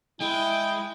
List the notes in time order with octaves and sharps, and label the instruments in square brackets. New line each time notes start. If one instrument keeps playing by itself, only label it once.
[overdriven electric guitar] G#3 [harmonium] E4 [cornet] G5